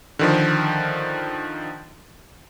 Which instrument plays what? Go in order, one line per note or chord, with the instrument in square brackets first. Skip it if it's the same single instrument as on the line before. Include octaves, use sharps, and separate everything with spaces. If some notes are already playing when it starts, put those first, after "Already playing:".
[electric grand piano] D3 D#3 F3